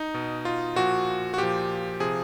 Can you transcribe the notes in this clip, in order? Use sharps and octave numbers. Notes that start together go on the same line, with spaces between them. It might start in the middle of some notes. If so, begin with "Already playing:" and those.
Already playing: D#4
B2
F4
A#2 F3 F#4
F#4
A#2 F3 G4
C3 F3 G#4